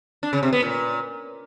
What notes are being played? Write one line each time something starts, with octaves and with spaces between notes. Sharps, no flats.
D4
C#3
C3
B3
A#2